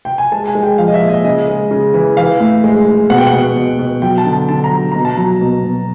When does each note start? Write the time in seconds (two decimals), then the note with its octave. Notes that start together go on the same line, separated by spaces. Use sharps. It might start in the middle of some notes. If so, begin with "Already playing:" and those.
0.05 G5
0.18 G#5
0.32 G#3 A5
0.48 G#5
0.55 G#3
0.63 G5
0.78 F3 F5
0.88 D#5
0.94 E5
1.02 A#2
1.09 D#5
1.24 C#3 D#5
1.48 G#3
1.71 C#3
1.94 E3
2.17 E3 F5
2.40 A2
2.64 G#3
2.87 G#3
3.10 B2 F#5
3.18 G5
3.27 F#5
3.33 B2
3.56 B2
3.79 B2
4.02 F#3 G5
4.18 A5
4.25 D3
4.33 A5
4.49 D3 A5
4.64 A#5
4.71 F#3
4.92 B2 A#5
5.05 A5
5.17 F#3 A#5
5.41 B2
5.64 B2